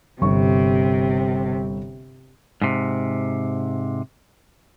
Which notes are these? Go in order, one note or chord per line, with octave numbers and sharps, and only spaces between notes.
G1 C3 C#6
G#2 C3